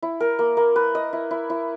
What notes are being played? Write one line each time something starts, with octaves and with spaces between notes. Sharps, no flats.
E4
A#4
A#3
A#3
B4
D#5
E4
E4
E4